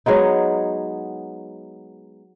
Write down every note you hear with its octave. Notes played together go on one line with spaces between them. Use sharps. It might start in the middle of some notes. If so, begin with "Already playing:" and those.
F#3 G#3 B3 D#4